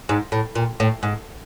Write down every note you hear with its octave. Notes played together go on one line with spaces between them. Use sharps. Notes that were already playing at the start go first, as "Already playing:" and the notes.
G#2
A2
A#2
A2
G#2